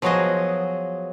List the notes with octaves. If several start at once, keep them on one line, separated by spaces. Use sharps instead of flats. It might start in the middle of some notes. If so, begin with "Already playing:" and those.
F3 F#3 B3 F#4 G#4 D#5